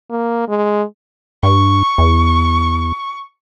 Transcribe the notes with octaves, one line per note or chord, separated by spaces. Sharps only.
A#3
G#3
G2 C#6
E2